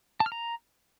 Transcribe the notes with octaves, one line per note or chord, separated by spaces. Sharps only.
A5
F6
A#5